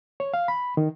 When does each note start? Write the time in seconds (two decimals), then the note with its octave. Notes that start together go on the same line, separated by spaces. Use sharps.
0.20 C#5
0.34 F5
0.48 B5
0.77 D#3